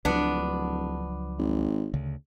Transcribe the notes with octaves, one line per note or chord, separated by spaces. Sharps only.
D1 C#2 F3 F#3 B3 D4
G#1
D2 C#3